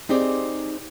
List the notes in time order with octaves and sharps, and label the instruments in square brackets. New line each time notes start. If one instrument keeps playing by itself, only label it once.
[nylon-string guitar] C4 D#4 G4 G#4 C5 D5